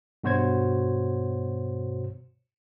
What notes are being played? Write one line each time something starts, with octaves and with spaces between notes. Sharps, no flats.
G2 B2 F#4 C5 C#5 G#6